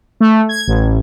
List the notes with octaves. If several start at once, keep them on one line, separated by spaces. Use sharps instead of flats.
A3
G#6
A1